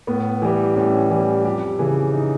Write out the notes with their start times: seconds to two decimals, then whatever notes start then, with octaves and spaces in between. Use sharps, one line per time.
0.07 A2 B3
0.42 E3 G3
0.76 A2 C#4
1.10 E3 G3
1.44 F2 G4
1.79 C#3 E3
2.13 D#4